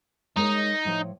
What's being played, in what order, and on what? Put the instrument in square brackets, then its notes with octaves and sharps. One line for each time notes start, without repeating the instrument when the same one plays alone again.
[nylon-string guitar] G#3 A#4 C#5 [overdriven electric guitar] D#4
[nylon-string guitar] A2 F3 C#5